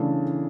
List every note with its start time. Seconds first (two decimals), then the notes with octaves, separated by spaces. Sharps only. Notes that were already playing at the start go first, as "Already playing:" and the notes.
Already playing: C#3 E3 A3 D4